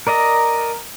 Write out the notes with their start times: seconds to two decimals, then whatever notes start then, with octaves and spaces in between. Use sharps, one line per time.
0.07 A#4 D5 D#5 A#5